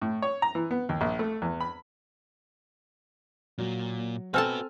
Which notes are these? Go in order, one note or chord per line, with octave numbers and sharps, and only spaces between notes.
A2
C#5
A#5
E3
B3
D#2
A#1
A3
E2
B5
A#2 F#3
C4 F#4 A4 B4 G#5 A5 E6 F6